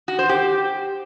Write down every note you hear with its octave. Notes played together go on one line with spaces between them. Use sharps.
F#4
C5
G4